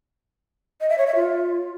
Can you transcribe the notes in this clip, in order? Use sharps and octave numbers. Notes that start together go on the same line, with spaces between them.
D#5
E5
C#5
E5
F4